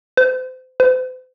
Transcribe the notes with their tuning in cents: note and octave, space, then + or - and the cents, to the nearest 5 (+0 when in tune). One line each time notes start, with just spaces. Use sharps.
C5 -30
C5 -45